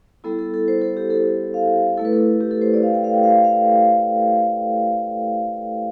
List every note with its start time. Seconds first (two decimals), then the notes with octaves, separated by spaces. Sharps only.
0.24 G3 B3 E4 A4
0.39 A4
0.54 A4
0.68 C5
0.81 A4
0.97 G4
1.10 A4
1.54 F5
1.97 A3 E4 A4
2.05 B4
2.13 A4
2.40 G4
2.51 A4
2.62 C5
2.74 D5
2.83 F5
2.94 G5
3.04 F5
3.14 G5
3.23 F5
3.34 G5
3.44 F5